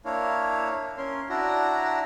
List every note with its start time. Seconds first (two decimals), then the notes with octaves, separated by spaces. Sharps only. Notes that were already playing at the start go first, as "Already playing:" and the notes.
0.05 A#3 D4 E4 C#5 F5
0.98 C#4 A#4 C6
1.29 D4 E4 F#4 D5 A#5